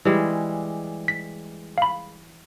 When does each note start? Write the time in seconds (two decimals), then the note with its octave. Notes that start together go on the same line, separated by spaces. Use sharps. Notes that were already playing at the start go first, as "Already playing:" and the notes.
0.05 E3 G3 G#3
1.08 B6
1.78 F5 B5